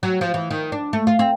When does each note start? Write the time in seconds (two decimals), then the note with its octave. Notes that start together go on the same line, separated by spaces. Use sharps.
0.03 F#3
0.21 F3
0.34 E3
0.51 D#3
0.72 D4
0.93 A3
1.07 F4
1.19 C4